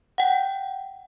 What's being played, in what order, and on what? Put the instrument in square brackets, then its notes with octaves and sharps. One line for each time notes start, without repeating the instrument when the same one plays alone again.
[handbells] F#5 G5